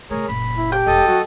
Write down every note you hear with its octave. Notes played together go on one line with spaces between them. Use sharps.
C3 A3 G#4 A#4 C#5
F#1 A#2 B5
E4
G4 G5
E1 A4 D#5
F#3 E4 F#4